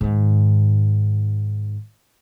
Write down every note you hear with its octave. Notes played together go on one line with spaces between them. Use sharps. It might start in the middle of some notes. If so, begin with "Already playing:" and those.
G#2 D#3